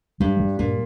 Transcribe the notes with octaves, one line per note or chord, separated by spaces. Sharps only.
G2 G3
G3
G2 A#2